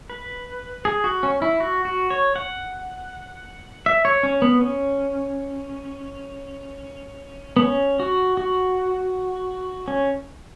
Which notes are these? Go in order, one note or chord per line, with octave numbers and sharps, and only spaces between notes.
B4
G#4
F#4
C#4
E4
F#4
F#4
C#5
F#5
E5
C#5
C#4
B3
C#4
B3
C#4
F#4
F#4
C#4